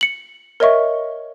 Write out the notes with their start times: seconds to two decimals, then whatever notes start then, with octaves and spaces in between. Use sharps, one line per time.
0.01 C#7 F#7
0.60 A#4 C#5 D#5 E5 C#6